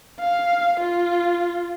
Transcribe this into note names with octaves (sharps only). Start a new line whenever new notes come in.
F5
F4